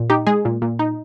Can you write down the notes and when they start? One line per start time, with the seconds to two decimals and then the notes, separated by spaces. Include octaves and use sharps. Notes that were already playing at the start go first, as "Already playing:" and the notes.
Already playing: A#2
0.10 D#4 G4
0.27 G#3 G#4
0.45 A#2
0.62 A#2
0.79 D#4